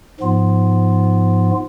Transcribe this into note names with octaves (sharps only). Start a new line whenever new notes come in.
G#2 F3 B3 F4